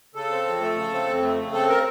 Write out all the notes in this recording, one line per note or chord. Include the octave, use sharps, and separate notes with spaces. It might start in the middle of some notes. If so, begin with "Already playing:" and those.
C#3 A4
C4
F2
A3
C#3
C4
F2
A3
C#3
C4 A4
A#4